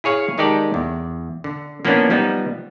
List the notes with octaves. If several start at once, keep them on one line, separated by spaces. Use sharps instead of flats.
E4 G#4 C#5 F5
D#3 G#3 D#4 G4 A4 D5
E2
D3
F3 A#3 B3 C#4 D4 E4
F3 G3 B3 D#4